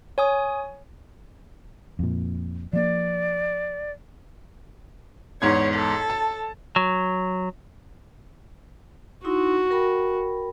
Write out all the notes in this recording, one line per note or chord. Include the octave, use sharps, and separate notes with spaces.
C#5 G#5 D#6
F2 A#2
F3 A#3 D5
E2 G#2 C#5 G#6
A4
A5
F#3
D#4 E4 F#4 C6
A#4 G5 B5